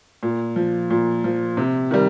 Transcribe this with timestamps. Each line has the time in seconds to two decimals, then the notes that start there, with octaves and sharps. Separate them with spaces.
0.23 A#2
0.56 F3
0.90 A#2
1.24 F3
1.57 C3
1.91 D#3 G3